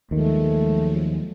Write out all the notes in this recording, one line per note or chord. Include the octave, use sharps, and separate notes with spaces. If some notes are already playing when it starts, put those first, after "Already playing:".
D#2 D#3 F3 F#3 G#3 A3